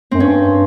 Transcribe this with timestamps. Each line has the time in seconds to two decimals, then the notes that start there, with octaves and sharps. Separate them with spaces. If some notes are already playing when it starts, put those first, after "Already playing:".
0.11 F#2 C4
0.20 G2 C#4